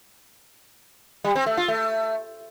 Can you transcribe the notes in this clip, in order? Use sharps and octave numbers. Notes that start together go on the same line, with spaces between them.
G3
C4
A3
F4
A3